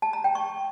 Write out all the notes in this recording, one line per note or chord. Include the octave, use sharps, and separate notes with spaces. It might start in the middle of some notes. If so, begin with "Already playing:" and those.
A5
A#5
G5
C#6